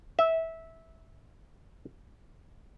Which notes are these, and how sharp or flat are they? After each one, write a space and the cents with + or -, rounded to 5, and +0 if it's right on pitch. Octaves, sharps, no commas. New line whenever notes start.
E5 -15